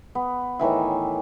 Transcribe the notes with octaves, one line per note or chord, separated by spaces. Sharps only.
B3
A2 D#3 E3 E5